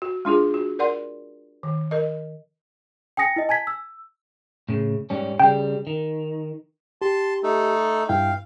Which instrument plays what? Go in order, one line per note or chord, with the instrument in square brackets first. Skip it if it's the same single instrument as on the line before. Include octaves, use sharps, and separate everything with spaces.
[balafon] F#4
G#3 D4 F4 G#4
F#4
A#4 D5 F#5 C6
D#3
A#4 D#5
[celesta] G5 G#5 D#6 A#6 C#7
E4 D#5
G#5 A5 G#6 B6
E6
[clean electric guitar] A2 C#3
G#2 G3 C#4
[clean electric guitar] C#3 G3 [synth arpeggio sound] G5
[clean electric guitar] D#3
[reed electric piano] G4 [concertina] A5 C6
[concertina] A3 D#4 A4
[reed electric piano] G2 E4 G5 [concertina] F5